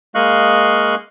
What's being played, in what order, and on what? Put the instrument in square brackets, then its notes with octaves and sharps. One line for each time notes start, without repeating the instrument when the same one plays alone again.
[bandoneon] G#3 A#3 D#5 F5 C#6 F#6